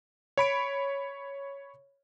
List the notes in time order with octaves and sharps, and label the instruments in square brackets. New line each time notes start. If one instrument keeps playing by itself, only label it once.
[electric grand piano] C#5 B5 D7